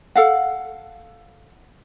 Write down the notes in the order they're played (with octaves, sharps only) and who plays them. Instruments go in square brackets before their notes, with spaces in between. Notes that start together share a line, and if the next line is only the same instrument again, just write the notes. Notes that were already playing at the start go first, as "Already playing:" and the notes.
[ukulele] A4 F5 F#5